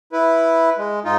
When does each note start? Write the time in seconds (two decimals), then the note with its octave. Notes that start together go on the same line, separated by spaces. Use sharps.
0.13 E4 B4
0.78 G#3
1.05 G#2 D#4 F4